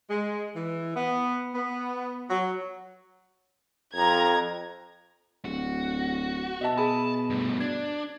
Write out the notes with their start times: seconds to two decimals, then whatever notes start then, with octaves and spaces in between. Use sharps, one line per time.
0.10 G#3
0.56 E3
0.96 B3
1.55 B3
2.30 F#3
3.95 F2 A#5 G#6
5.45 D1 F#4
6.61 B2 D#5 E5 A5
6.78 G#4 G#5 A5 B5
7.30 G2 A3
7.60 D4 G#6